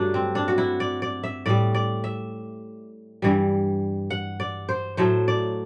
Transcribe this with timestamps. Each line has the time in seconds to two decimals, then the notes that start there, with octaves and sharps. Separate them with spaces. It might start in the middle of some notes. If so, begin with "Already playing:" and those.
Already playing: G2 D3 F#3 A3 D4
0.14 C4
0.35 D4
0.48 F#4
0.58 E4
0.80 D5
1.02 D5
1.23 E5
1.46 A2 G3 D5
1.75 D5
2.04 E5
3.22 G2 E3 G3
4.10 F#5
4.40 D5
4.69 C5
4.97 A2 F#3 A3 C5
5.28 D5